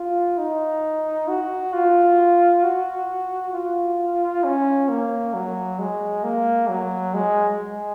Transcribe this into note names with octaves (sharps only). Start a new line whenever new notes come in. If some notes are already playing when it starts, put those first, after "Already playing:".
Already playing: F4
D#4
F#4
F4
F#4
F4
C#4
A#3
F#3
G#3
A#3
F#3
G#3
G#3